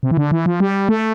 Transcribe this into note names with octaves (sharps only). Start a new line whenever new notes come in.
C3
E3
D3
E3
F3
G3
A3